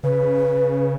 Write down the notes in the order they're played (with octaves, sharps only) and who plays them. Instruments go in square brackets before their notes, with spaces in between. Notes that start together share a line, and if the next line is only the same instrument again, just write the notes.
[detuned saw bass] C#3 [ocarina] B4